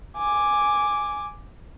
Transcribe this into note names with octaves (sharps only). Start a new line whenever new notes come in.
G#5 D6